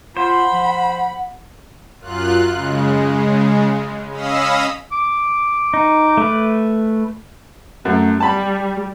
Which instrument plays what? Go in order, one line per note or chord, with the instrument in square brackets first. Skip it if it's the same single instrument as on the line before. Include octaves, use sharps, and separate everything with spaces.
[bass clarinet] F4 [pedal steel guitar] C5 [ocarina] F#5 [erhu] B5
[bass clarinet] F3
[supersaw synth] F#2 F4 F#6
C#3 G#3
C#4 D#5 F5 B5 D#6 E6
[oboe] D6
[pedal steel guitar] D#4
A3 B4
[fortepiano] F#2 [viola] A3
[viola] G3 [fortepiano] A5 B5